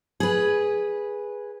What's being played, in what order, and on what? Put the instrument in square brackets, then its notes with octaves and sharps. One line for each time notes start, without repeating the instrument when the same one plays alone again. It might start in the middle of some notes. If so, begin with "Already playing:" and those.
[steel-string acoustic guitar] G#4 B4